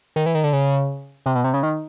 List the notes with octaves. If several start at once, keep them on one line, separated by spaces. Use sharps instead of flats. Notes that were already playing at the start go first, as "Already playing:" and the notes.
D#3
E3
D#3
D3
C#3
C3
B2
C3
C#3
D#3